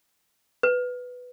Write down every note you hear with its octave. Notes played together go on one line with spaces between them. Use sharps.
B4